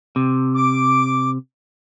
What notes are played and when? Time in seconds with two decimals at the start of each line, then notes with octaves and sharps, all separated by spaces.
0.16 C3
0.55 D6